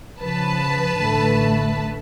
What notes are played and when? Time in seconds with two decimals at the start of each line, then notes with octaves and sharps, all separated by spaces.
0.21 C#3 F3 B4 A5
0.98 A1 D3 A3